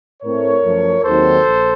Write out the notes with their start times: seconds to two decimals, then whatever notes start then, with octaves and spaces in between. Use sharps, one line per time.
0.22 A2 A3 C4 A#4 C#5
0.63 F#2 F3 A3
1.04 D#2 D#3 F#3 C4 A4 C5
1.45 A#1